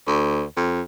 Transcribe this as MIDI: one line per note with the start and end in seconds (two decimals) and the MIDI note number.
0.07 0.44 38
0.57 0.82 41